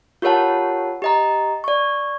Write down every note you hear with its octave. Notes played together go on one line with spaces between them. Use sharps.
F4 G4 A#4 C#5 F#5 A5
G4 D#5 A#5
D5 C#6